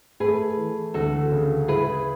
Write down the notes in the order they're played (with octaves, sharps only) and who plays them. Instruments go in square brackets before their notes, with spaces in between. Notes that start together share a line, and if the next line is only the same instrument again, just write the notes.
[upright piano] A3 [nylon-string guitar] G#4 B4
[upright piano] E3
[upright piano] D2 [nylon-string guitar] F#4 A4
[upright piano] C#3
[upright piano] E4 [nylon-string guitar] G#4 B4